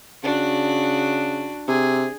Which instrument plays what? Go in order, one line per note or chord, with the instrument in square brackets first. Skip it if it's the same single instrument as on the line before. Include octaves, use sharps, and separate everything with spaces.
[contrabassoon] C#3 [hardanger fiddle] D4 F#4
[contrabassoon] C3 [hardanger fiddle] G#4